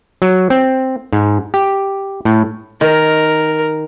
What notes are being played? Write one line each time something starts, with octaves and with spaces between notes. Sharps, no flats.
F#3
C4
G#2
G4
A2
D#3 A#4